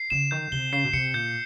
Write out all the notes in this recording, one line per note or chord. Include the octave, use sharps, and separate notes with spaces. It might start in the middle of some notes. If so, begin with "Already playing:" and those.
Already playing: C7
C#3 E7
D#3 G6
C3 G7
C#3 C7
B2
C3 C#7
A#2 G6